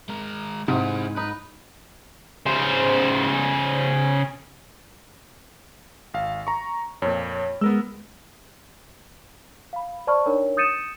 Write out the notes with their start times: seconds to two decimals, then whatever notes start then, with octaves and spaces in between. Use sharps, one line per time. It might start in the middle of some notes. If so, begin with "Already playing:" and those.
0.09 G#3 A#4
0.68 G#2 C3 E4 G#4
1.17 D#4 B4
2.46 C#3 C5
6.14 G#1 F5
6.47 A#5 C#6
7.02 F2 A#2 C#5
7.61 G#3 B3 A#4 E6
9.73 F5 B5
10.07 C5 D5 A5 B5 C#6 F6
10.26 D4 D#4 A#4 C#5
10.57 D#6 G6 A6 C#7 D#7 E7